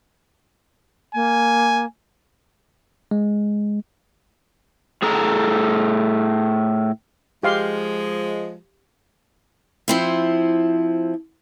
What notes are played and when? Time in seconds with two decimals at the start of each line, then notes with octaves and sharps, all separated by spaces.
1.15 A#3 G#5
3.11 G#3
5.02 A2 G#4 A4 A#5
7.43 F3 G#3 G4 F5 C6
9.88 F3 C4 E4